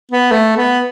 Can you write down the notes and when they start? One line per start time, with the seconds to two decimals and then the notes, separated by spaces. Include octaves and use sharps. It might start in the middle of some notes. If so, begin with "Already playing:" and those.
0.11 B3
0.31 A3
0.57 B3